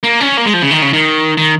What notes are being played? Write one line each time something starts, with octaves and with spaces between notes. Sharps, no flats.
A#3
C#4
A#3
G#3
F3
C#3
D#3
C#3
D#3
D#3